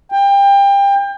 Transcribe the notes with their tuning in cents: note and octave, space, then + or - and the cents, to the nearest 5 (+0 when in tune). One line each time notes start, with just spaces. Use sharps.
G5 +25